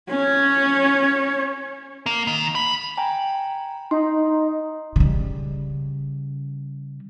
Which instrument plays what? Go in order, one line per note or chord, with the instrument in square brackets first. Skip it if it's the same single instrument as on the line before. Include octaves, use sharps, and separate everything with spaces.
[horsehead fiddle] C#4 C#5
[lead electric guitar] A#3
D#3
B5
[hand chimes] G5 G#5 A#5
[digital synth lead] D#4 [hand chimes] C6
[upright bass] C#3 G3